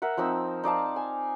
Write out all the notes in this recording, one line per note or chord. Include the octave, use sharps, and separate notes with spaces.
A#4 E5 F#5
F3 C4 D#4 E6
D#4 D5 F5 A5
G#5